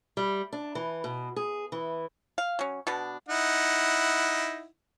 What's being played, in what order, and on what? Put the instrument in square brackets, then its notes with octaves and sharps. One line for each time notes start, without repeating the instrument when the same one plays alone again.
[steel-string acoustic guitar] G3
D4
E3
B2
G#4
E3
[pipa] F5
F#3 C#4
B2 B3 D4
[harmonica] D#4 E4 F#5